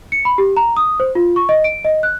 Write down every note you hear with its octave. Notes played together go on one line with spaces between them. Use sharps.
C#7
B5
G4
A#5
D#6
C5
F4
C#6
D#5
D7
D#5
F#6